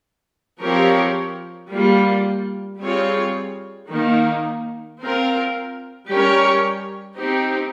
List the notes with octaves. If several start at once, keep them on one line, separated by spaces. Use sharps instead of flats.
F3 C4 G4 A#4 C#5
G3 A#3 F4
G3 C4 F4 G#4 C#5
D#3 A#3 D#4
C4 F4 A#4
G3 C#4 G4 A#4 C#5
C4 D#4 G4